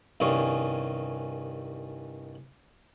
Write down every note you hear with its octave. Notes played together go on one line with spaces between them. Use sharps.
C2 G2 D#3 C#4 G#4 C#6